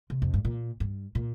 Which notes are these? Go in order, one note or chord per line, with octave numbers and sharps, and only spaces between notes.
C3
F2
G2
A#2
G2
A#2